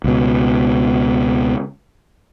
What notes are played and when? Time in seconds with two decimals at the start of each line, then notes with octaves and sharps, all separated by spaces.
0.04 C#2 B2